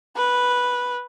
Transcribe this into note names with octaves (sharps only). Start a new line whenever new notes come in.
B4